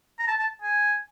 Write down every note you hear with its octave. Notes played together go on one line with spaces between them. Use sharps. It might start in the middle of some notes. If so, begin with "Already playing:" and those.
A#5
A5
A5
G#5